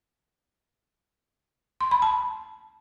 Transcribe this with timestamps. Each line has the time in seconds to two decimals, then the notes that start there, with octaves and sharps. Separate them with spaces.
1.81 C6
1.91 B5
2.02 A5